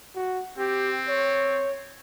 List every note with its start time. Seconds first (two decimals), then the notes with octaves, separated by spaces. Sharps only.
0.15 F#4
0.58 C4 G4
1.08 C#5